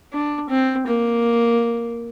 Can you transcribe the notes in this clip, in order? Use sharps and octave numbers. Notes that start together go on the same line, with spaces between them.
D4
C4
A#3